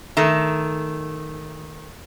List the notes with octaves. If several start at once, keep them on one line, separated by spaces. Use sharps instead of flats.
D#3 A3